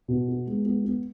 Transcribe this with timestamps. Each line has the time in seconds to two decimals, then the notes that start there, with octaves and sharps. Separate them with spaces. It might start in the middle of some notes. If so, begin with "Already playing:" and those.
0.08 B2
0.28 B3
0.47 G#3
0.65 B3
0.85 B3